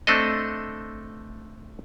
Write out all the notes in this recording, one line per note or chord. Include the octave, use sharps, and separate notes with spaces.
A3 C4 D4 A4 D#5